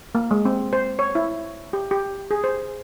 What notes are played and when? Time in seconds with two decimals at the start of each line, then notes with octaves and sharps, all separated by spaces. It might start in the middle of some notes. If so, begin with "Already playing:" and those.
0.15 A#3
0.31 G#3
0.45 C4
0.73 C5
0.99 C#5
1.15 E4
1.73 G4
1.91 G4
2.31 G#4
2.44 C5